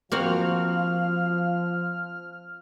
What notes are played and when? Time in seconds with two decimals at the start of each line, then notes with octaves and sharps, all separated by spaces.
0.12 F3 A#3 C4 F#4 F5 F6